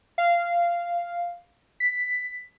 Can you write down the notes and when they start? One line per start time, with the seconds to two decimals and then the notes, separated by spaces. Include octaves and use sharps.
0.18 F5
1.80 B6